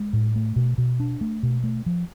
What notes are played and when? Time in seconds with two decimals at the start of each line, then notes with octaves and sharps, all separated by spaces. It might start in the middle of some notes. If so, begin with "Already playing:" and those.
Already playing: G#3
0.13 A2
0.36 A3
0.56 B2
0.78 B2
1.00 D4
1.21 A3
1.43 B2
1.64 A3
1.86 F3